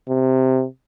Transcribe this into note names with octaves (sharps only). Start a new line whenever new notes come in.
C3